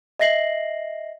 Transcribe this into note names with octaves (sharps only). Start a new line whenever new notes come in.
D#5 E5 A#6 C7 F#7